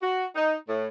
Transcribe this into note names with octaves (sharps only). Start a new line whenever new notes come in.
F#4
D#4
A2